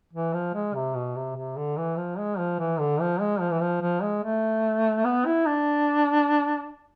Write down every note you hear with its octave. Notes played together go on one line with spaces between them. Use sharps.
E3
F3
G#3
C3
B2
C3
C3
D3
E3
F3
G#3
F3
E3
D3
F3
G#3
F3
E3
F3
F3
G#3
A3
B3
E4
D4